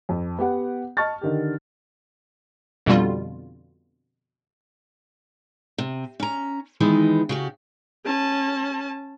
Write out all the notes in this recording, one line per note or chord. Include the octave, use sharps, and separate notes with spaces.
F2
B3 G4 F#5
D#5 A5 C#6 F6 A6
D3 D#3 G4
F2 B2 D3 G3 F4
C3
C#4 A#5
D#3 E3 G#3 B3 D#4
C#3 F#4 G4
C#4 A5